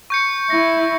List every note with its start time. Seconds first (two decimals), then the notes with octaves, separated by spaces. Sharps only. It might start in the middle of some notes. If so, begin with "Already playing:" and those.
0.10 C#6 G6 C#7
0.50 E4 A#6